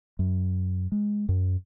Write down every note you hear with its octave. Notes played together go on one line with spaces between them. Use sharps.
F#2
G#3
F#2